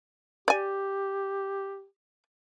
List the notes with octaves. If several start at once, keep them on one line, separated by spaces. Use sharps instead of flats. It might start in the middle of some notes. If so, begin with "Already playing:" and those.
G4 D5 G#5